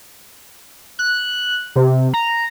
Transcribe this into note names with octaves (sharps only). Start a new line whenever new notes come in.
F#6
C3
A#5